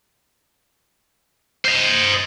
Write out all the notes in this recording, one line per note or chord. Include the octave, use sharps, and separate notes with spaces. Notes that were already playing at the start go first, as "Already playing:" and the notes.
C5 D#5